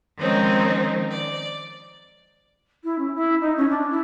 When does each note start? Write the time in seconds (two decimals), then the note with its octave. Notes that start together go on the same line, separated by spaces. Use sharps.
0.17 D#3 F3 G#3 C4 C#4 D#4
1.09 D5
2.84 E4
2.99 C#4
3.14 E4
3.41 D#4
3.57 C#4
3.70 D4
3.90 E4